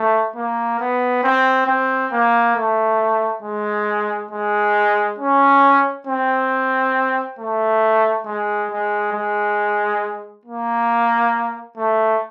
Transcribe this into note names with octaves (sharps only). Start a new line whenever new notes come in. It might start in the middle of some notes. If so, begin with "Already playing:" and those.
Already playing: A3
A#3
B3
C4
C4
A#3
A3
G#3
G#3
C#4
C4
A3
G#3
G#3
G#3
A#3
A3